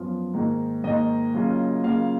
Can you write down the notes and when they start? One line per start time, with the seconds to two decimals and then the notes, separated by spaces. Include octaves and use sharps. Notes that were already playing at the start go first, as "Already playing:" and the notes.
Already playing: F#2 F3 B3 F4
0.34 G#2 D#3 A#3 D#4
0.84 G#2 D#3 A#3 D#4 D#5
1.34 C#3 F#3 A#3 C#4 F4
1.84 C#3 F#3 A#3 C#4 F4 F5